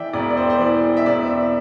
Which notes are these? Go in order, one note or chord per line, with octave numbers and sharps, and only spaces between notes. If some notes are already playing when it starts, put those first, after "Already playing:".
Already playing: E3 D5 E5 G5
E1 D5
D5
C5
C5
E3 D5
E5
E1 D5